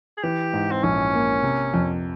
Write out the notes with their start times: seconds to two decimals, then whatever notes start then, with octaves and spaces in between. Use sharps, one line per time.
0.18 G#4
0.23 E3 G4
0.53 G#2
0.71 C4
0.83 A#1 C#4
1.14 A#3
1.43 C3
1.74 F2